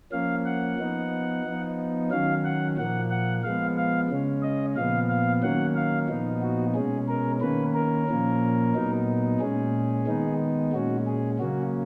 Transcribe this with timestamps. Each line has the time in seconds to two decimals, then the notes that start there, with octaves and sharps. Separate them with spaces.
0.12 F3 A#3 C#4 F5
0.45 F#5
0.78 F3 B3 D#4
1.44 F3 B3 D#4
2.11 D#3 F#3 C#4 F5
2.44 F#5
2.77 A#2 F3 A#3 F#5
3.10 F#5
3.44 F3 G#3 B3 F5
3.77 F5
4.10 C#3 G#3 C#4
4.42 D#5
4.76 A#2 F3 B3 F5
5.09 F5
5.43 D#3 F#3 A#3 C#4 F#5
5.76 F5
6.08 A#2 F3 B3 D#4
6.42 F#4
6.75 B2 G#3 C#4 G#4
7.08 A#4
7.41 D#3 A#3 C#4 B4
7.75 A#4
8.08 A#2 F3 A#3 C#4
8.75 A#2 F#3 B3 D#4
9.40 A#2 G#3 C#4 G#4
10.07 D#3 G#3 B3 D#4
10.73 A#2 G#3 C#4 F#4
11.06 G#4
11.39 C#3 F#3 A#3 C#4 F#4